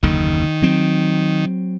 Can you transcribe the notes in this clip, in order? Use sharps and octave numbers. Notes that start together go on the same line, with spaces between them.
F#1 D#2 D3 D#3
F#3 C4